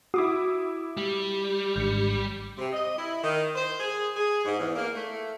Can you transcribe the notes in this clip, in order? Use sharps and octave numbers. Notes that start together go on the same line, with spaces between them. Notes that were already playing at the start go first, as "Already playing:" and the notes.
E4 F#4 D6 D#6
G3
G#1 G#2 D3 G6 C#7
C3
D#5
E4
D#3
C5
G#4
G#4
G#2
E2
A#3
A3